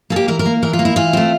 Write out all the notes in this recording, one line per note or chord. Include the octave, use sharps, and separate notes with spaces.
A#3 A4
G4
E3 A#4
A#4
A#3
E3 A#4
F4
A#3
E4
E3 F4
A3 C4